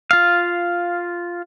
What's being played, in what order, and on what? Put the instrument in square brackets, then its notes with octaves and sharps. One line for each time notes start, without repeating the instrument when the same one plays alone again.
[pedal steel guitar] F4 F5